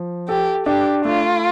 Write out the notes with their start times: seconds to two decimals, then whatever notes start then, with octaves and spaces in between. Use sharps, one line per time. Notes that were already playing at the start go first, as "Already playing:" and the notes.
Already playing: F3
0.28 G4 A4
0.66 D4 G4
1.05 A3 F4